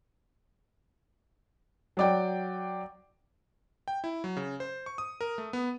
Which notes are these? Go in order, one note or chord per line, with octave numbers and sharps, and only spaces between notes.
F#3 D5 G5
G5
E4
F#3
C#3
C5
C#6
D#6
A#4
A3
B3